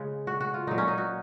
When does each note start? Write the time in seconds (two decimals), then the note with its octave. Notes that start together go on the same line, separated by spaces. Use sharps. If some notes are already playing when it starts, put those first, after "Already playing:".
Already playing: C#3 G#3
0.27 F#4
0.40 F#4
0.54 F4
0.67 A#2 F#3 D#4
0.78 C#4
0.88 D#4
0.98 F#4